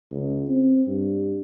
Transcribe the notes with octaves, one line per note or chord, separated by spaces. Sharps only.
C#2
C4
G2